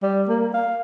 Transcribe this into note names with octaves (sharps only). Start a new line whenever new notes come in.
G3
A#3
F5